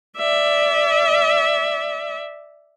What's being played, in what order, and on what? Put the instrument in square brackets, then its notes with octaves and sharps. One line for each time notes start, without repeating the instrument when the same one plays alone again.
[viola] D5 E5